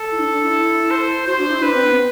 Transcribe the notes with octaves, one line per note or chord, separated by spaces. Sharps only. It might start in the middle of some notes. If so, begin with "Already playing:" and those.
Already playing: A4
E4
D4
D4
E4
C5
F#4 C5
D4
E4
D4 B4
C4
B3